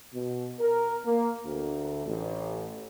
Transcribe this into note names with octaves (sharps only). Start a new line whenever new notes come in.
B2
A#4
A#3
D2
A1